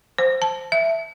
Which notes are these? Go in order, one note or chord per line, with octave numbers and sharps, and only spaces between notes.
C5
A5
E5